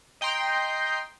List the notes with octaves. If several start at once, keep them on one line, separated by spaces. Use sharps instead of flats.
D#5 G5 A#5 C6